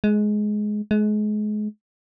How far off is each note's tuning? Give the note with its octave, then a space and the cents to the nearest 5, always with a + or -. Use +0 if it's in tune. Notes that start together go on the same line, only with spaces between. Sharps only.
G#3 +15
G#3 +30